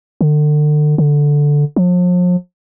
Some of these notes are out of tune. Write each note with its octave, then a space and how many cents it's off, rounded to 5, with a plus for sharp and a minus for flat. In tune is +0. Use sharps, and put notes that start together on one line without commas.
D3 +35
D3 -5
F3 +40